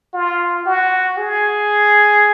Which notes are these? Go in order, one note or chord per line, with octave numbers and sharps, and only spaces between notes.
F4
F#4
G#4